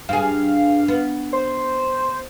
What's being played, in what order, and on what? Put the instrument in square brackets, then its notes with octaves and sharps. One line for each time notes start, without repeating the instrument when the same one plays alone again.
[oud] G2 G#4 [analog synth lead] F5
[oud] B3
[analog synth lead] C5